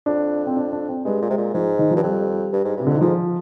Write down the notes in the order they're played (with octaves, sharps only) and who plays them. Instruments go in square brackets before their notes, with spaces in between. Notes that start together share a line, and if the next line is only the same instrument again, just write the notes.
[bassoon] F2 [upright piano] D4
[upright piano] C4
D4
D4
C4
[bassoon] G2 [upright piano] G#3
[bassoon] A#2
[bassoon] C3 [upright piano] G#3
[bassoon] A#2
[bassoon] G#2 [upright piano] F3
[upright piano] D#3
F3
[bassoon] G2
[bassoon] F2 [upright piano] G3
[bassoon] G2
G#2
[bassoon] G2 [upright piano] C3
[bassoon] F2 [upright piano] D3
[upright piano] D#3
[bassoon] G#2 [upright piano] F3